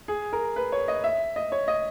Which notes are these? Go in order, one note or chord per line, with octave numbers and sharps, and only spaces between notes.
G#4
A#4
B4
C#5
D#5
E5
D#5
C#5
D#5